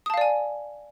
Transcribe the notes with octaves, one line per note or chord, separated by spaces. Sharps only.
D5 F5 G#5 A5 D#6